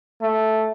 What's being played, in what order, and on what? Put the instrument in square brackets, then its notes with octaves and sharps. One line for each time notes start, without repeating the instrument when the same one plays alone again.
[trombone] A3